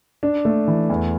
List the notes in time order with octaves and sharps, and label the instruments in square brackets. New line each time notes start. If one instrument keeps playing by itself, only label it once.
[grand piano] D4
A3
E3
E2